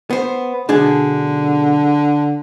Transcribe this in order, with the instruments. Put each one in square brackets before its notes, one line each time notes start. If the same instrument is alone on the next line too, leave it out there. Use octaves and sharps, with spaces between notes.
[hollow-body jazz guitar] B3 C5
[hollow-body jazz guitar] B1 D4 G#4 [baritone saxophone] D3